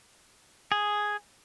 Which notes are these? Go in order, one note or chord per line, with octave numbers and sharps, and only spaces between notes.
G#4